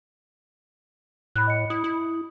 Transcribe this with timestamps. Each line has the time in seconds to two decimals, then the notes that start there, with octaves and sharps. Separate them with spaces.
1.36 A2 B5 F#6
1.47 D#5 C#7
1.70 E4 D#6
1.84 E4